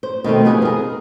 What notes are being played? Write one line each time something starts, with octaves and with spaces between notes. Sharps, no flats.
C5
B2 D#3 A3 C4
F2 G3 B3 G#4
G#4 A#4